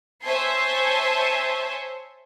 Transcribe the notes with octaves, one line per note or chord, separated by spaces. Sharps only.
C5 C#5 E5 G#5 A5 C6